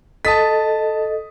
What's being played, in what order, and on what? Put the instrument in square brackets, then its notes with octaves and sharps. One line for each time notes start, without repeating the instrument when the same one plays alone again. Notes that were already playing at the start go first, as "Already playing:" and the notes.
[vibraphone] A4 D#5 [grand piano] A5 D#6 B6